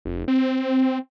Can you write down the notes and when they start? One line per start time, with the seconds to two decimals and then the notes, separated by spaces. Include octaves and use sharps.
0.05 F1
0.28 C4